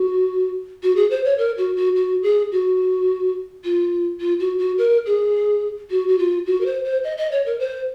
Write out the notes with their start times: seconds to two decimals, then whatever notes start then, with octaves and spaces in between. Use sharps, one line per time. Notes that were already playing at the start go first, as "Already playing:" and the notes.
Already playing: F#4
0.83 F#4
0.96 G#4
1.10 C5
1.24 C#5
1.38 A#4
1.57 F#4
1.76 F#4
1.95 F#4
2.23 G#4
2.52 F#4
3.64 F4
4.20 F4
4.39 F#4
4.58 F#4
4.78 A#4
5.06 G#4
5.90 F#4
6.08 F#4
6.18 F4
6.46 F#4
6.60 A#4
6.66 C5
6.84 C5
7.04 D#5
7.17 D#5
7.32 C#5
7.46 A#4
7.59 C5